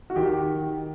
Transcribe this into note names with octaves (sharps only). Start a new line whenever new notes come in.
F#4
D#3 G4